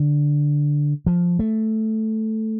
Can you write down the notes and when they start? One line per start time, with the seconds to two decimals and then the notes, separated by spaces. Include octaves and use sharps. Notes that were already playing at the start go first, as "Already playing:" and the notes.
Already playing: D3
1.06 F3
1.39 A3